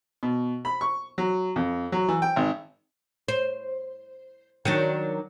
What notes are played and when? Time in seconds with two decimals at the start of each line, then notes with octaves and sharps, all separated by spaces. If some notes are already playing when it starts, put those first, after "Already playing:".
0.23 B2
0.65 B5
0.81 C#6
1.18 F#3
1.56 F2
1.92 F#3
2.08 E3
2.22 G5
2.36 G#1
3.28 C5
4.65 D#3 F#3 D4